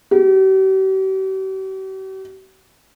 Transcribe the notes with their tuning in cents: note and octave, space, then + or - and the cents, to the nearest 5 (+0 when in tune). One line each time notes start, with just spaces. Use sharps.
G4 -45